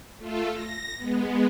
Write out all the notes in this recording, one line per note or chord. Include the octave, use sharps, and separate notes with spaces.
A3 F4 A4
A#6
G#3 B3